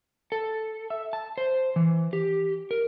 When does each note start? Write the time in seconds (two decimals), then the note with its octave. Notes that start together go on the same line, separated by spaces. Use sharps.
0.32 A4
0.90 E5
1.13 A5
1.38 C5
1.76 E3
2.13 G4
2.71 A#4